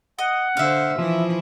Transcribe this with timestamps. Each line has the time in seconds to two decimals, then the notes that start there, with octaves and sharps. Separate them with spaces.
0.19 D#5 F#5
0.57 D3 C5 E5 F5
0.98 E3 F3 E4